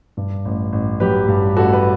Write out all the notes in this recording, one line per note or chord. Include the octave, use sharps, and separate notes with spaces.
G2
A1
A1
F#3 G4 B4
G2
A1 F#4 A4
B4